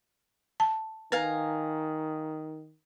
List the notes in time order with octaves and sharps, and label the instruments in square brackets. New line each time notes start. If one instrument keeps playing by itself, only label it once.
[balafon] A5
[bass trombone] D#3 [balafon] B4 [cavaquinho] F5 G#5 A#5